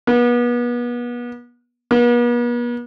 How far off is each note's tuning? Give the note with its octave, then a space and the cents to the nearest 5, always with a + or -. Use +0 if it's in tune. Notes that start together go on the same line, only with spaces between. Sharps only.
B3 -35
B3 -45